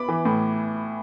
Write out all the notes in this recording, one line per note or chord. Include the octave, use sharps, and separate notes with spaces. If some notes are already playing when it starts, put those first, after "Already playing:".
Already playing: B3 B5 D6
E3
A2